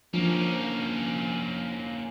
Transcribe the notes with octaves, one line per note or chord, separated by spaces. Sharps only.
F3 A#3 C#4 D4 F4